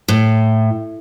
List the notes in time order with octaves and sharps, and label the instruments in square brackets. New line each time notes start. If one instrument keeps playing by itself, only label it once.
[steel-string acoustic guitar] A2